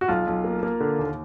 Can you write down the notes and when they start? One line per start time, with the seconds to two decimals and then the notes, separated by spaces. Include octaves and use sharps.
0.01 F#4
0.08 B1 F4
0.27 B1
0.44 A#3
0.63 A#3
0.81 D3
0.99 D#2